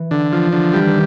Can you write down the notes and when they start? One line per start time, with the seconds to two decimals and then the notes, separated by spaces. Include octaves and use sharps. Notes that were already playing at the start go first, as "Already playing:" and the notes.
Already playing: E3
0.11 D3
0.33 F3
0.53 D3
0.73 E3 G3
0.86 D#3